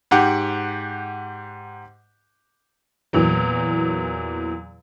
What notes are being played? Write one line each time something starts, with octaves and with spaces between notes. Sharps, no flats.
G#2 G4 F#5 D6
E2 A#2 E3 F#3